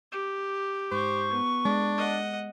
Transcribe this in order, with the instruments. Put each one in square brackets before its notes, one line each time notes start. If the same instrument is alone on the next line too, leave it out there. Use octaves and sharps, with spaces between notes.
[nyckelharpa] G4
[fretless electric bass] G#2 [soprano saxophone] C5 [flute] C#6
[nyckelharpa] B3
[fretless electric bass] G#3 [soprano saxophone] D4
[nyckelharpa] D#5 F#5